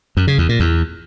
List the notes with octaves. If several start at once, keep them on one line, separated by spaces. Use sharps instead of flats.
F#2
C#3
E2
A#2
E2